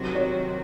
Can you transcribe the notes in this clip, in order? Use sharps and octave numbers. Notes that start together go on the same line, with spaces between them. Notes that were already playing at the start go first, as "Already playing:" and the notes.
Already playing: C3 D#3 F#3 C4 F#4
C#5